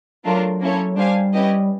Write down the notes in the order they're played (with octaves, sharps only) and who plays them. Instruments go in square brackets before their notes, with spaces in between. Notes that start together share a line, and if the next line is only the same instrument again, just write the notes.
[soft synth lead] F#3 [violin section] A3 D4 F4 A#4
[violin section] A#3 C#4 E4 A4 C#5
[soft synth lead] G3 [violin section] D4 G4 C5 F5 G#5
[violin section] C#4 E4 G4 B4 D#5